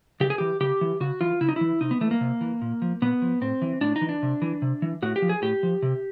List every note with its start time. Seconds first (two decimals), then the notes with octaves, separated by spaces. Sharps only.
0.20 C#3 G4
0.30 G#4
0.38 E3 G4
0.60 C#3 G4
0.81 E3
1.00 C#3 F#4
1.21 E3 F4
1.41 C#3 E4
1.49 D#4
1.56 E3 E4
1.81 C3 D#4
1.91 B3
2.01 E3 A3
2.11 A#3
2.21 C3
2.41 E3
2.61 A#2
2.82 F3
3.02 A#2 B3
3.22 F3
3.41 A2 C4
3.62 E3
3.81 A2 D4
3.96 D#4
4.01 E3
4.09 D4
4.23 C3
4.42 E3
4.62 C3
4.82 E3
5.02 A2 F#4
5.16 G4
5.22 F3
5.29 G#4
5.42 A2 G4
5.63 F3
5.82 C3